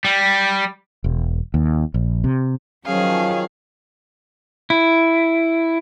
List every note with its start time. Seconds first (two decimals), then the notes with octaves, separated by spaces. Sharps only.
0.05 G3
1.04 E1
1.54 D#2
1.94 A#1
2.24 C3
2.86 D#3 F3 F#3 C#4 G#4 F5
4.70 E4